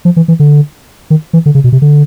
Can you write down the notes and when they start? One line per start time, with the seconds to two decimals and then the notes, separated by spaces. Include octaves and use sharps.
0.05 F3
0.16 E3
0.28 E3
0.40 D3
1.10 D#3
1.33 E3
1.46 D3
1.55 C#3
1.64 B2
1.72 C3
1.82 D3